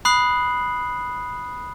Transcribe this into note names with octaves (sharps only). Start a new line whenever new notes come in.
B5 D#6 F#6 C7 F#7